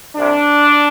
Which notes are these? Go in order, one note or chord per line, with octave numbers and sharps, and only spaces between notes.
C2 C3 D4